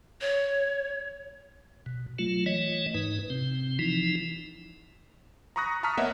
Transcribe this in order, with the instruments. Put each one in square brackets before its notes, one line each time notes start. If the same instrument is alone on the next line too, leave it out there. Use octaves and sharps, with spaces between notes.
[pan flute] C#5
[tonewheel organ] B2
F#3 A3 F4
E3 A3 C#5 D#5
G#2 D#4 B4
C3 C4
E3 F3 D#4 E4
[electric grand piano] A#5 B5 C#6 D#6 F#6 A#6
A5 A#5 C#6 D#6 F6 B6
A#3 B3 C#5 D#5 E5 F#5